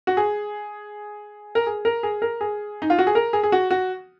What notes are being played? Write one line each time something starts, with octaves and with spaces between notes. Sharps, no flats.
F#4
G#4
A#4
G#4
A#4
G#4
A#4
G#4
D#4
F4
F#4
G#4
A#4
G#4
G#4
F#4
F#4